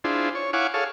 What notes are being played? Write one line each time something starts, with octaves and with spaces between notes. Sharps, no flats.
D4 E4 F4 G#4 C5
C#5
E4 C#5 F5 F#5 G#5 D6
G#4 A4 C#5 F5